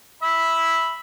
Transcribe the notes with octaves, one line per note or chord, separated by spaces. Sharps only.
E5 B5